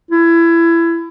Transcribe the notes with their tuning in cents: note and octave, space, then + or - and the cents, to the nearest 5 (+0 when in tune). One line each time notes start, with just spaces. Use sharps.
E4 +25